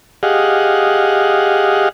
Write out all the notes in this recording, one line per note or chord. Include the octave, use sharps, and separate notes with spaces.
G4 G#4 D#5 F5 F#5